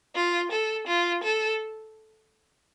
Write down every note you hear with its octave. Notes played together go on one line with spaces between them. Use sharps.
F4
A4
F4
A4